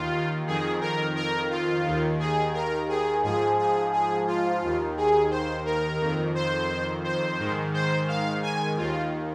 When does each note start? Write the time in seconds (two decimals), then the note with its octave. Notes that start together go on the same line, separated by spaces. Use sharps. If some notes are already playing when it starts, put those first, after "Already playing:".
Already playing: D#2 D#3 F4
0.47 F2 D#3 G#4
0.81 A#4
1.16 A#4
1.50 F4
1.85 D#2 D#3
2.20 G#4
2.54 A#4
2.89 G#4
3.23 G#2 F3 G#4
3.59 G#4
3.93 G#4
4.27 F4
4.62 D#2 D#3
4.97 G#4
5.31 C5
5.65 A#4
6.00 F2 D#3
6.35 C5
7.04 C5
7.39 G#2 D#3
7.74 C5
8.08 F5
8.42 G#5
8.77 D#2 D#3 F4